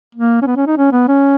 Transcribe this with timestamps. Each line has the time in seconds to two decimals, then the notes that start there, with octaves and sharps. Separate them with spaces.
0.15 A#3
0.42 C#4
0.46 B3
0.56 C#4
0.67 D#4
0.78 C#4
0.92 B3
1.08 C#4